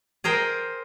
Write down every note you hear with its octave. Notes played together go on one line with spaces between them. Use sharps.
G#4 A#4 C5 G5